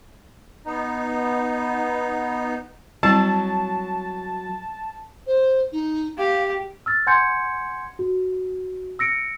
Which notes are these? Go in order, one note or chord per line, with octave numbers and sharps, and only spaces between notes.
B3 D#4
F#3 G3 C4 E4 A5
C5
D#4
G4 F5
E6 F6 A6
F#5 G#5 C6 G6 G#6 C#7
F#4
E6 A#6 C#7 D7